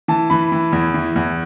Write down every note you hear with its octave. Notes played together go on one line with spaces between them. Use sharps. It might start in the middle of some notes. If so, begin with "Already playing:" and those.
E3 A5
E3 B5
E3
E2
E3
E2